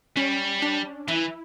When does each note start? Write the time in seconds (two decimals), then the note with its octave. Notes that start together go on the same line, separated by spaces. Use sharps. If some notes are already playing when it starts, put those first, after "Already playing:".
0.16 G3 C#4
0.62 D4
1.08 E3 E4